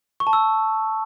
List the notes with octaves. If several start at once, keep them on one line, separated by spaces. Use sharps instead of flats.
C#6
A5
E6